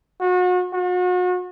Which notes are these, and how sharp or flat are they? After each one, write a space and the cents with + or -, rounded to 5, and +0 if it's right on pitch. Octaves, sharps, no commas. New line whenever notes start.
F#4 -35
F#4 -40